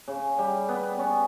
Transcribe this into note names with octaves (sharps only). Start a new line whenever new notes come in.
C#3
G3
B3
C#4